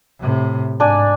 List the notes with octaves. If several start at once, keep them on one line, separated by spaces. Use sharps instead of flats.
A2 C3
G#2 D4 D5 G#5